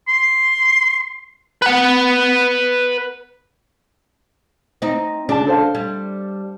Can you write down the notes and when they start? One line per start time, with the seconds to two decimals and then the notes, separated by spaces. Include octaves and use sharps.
0.08 C6
1.62 B4 F#5
4.82 C4 D#4
5.29 C#3 D4 A5
5.47 A4 C5 F5
5.75 G3